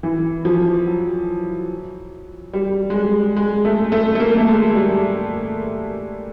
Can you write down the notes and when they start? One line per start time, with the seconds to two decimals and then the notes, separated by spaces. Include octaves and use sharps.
0.03 E3
0.45 F3
0.87 F#3
2.53 G3
2.90 G#3
2.96 G3
3.36 G#3
3.65 A3
3.92 A3
4.15 A3
4.20 A#3
4.38 A3
4.48 G#3
4.75 G3